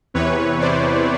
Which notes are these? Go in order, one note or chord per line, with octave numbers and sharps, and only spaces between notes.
E2 C3 E3 B4 C#5
C5 D5